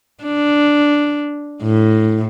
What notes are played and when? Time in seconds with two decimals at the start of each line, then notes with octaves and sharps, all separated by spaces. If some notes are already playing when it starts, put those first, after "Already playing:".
0.24 D4
1.63 A2